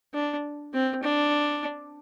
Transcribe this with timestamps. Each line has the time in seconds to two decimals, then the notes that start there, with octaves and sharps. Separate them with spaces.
0.14 D4
0.73 C4
1.03 D4